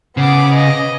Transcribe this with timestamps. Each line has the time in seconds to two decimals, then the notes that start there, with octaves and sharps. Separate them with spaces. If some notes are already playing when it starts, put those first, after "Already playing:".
0.17 C#3 B3 D6
0.54 D#5